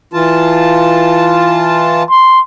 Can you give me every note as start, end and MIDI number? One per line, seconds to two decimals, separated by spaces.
0.13 2.03 52
0.13 2.03 65
0.13 2.03 81
2.10 2.40 84